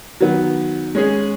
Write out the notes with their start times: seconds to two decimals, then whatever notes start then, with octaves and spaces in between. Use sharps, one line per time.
0.21 D#3 F#3 B3
0.95 G#3 C#4 G#4